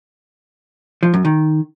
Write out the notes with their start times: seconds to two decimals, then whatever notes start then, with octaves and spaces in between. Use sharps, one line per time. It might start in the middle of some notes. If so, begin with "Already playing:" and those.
1.03 F3
1.14 F#2
1.25 D#3